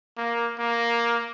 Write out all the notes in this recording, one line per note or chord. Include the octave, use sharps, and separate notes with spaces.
A#3
A#3